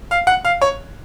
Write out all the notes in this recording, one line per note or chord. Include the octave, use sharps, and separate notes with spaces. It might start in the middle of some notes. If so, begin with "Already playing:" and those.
F5
F#5
F5
C#5